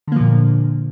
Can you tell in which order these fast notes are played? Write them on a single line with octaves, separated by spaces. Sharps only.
D3 A#3 F3 A#2